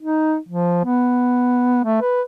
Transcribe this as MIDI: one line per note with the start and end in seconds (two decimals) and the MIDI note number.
0.03 0.36 63
0.48 0.84 53
0.84 1.83 59
1.84 2.01 57
2.01 2.21 71